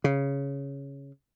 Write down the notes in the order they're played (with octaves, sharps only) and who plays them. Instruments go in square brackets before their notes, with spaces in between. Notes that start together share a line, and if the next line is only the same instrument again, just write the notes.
[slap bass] C#3